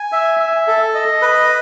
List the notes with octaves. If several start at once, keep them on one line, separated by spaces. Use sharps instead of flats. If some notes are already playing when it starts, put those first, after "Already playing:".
Already playing: G#5
E5
E5
A4
D#5
B4